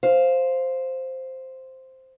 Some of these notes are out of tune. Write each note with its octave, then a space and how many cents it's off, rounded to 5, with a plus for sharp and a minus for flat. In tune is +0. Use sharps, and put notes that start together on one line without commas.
C5 +0 F5 +0